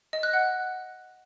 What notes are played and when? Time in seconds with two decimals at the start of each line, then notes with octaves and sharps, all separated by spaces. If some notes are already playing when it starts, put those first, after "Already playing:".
0.13 D#5
0.23 F#6
0.33 F#5